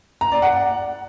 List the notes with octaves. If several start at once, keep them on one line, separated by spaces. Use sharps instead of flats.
A#5
D5
F#5